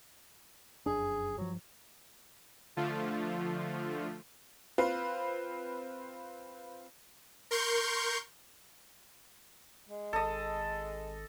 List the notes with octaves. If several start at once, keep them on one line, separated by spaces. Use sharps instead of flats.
F1 F#2 D4 G#4
G2 F3 F#3
D3 F3 A3 F4
C4 F4 B4
A#4 C6 C#6 G6
G#3
G#1 A4 D#5